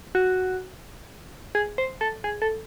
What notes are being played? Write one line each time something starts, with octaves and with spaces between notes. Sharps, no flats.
F#4
G#4
C5
A4
G#4
A4